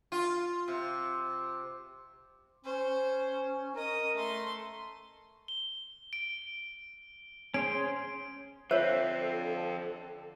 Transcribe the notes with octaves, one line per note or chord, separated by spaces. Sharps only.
F4
C3
C#4 C5
A#4 D#5 D#6
A3 C6
G7
D7
C#4 G#4 C5 D7
D3 F3 C4 A4 C5 C#5 E5